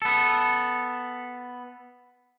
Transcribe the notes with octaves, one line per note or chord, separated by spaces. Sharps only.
B3 A4